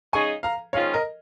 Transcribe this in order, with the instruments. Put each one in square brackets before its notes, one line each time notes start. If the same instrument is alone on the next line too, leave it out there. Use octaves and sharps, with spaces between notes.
[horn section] C#3 G#3 D#4 G#4 [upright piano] G#5 C#6
[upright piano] F5 A#5
[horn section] G#2 D#3 C#4 F4 [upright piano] C#5 F5
[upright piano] A#4 D#5